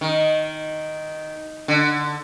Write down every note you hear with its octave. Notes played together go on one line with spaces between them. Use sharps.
D#3
D3